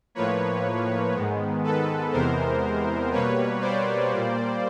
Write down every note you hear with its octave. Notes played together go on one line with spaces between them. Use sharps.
A2 F3 A#3 B4 C#5
G#2 D#3 G#3 B3
A4 B4
E2 C3 E3 G#3 B3 A#4 C5
B2 G3 A#3 B4 C#5
C5 D5
A#2 G3 A#3